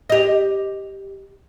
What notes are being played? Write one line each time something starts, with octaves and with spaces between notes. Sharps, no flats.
G4 D#5